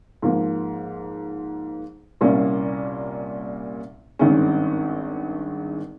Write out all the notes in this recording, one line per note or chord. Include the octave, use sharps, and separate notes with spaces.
G#2 F3 A#3
C2 A#2 G3 A#3 C#4
G#1 G2 D#3 G#3 C#4